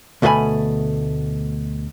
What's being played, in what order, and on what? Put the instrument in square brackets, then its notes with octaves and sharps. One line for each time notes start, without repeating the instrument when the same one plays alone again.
[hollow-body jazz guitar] D2 B2 A3 A4 G#5 B5